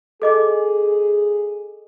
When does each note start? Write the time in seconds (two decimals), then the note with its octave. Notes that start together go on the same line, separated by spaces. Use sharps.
0.22 G#4 A4 D#5 D6